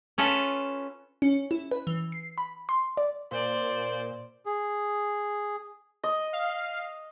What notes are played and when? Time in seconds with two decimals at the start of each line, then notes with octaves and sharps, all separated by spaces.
0.18 C#4 F4 A4 B4
1.22 C#4
1.51 E4
1.71 B4
1.87 E3
2.12 C7
2.38 B5
2.69 C6
2.97 D5
3.31 A#2 C5 D5
4.46 G#4
6.03 D#5
6.33 F5